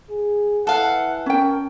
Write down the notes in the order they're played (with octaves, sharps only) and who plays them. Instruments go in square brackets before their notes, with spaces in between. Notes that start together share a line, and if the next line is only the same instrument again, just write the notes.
[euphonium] G#4
[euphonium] E3 [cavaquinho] A4 F5 [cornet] F#5
[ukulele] C#4 G5 [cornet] A#4